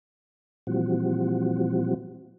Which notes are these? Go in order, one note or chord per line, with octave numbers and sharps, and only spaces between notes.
A#2 E3 F3 G3 C4 F#4